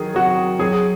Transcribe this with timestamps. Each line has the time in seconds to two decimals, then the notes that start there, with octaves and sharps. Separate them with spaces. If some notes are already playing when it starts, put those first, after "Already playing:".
Already playing: D#3 F#3 G#4
0.15 F#3 F#4
0.59 F#3 G#4